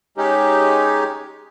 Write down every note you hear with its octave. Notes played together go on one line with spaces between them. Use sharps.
G#3 C#4 D#4 G4